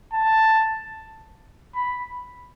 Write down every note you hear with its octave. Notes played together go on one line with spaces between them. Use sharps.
A5
B5